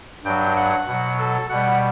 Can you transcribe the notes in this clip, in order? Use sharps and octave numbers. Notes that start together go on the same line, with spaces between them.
G2 F#3 G5
F#5
B2 F#3
A4
B2 G3 F#5